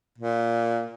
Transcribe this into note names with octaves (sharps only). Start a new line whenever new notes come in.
A#2